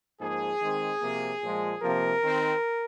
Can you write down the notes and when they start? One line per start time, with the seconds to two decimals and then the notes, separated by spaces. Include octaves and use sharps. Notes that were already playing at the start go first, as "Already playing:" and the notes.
0.21 G#2 F3 A#3 G#4
0.61 D#3 G#3 C4
1.02 C3 F3 A#3
1.42 A#2 F3 G#3
1.82 C3 F3 A#3 A#4
2.23 D#3 C4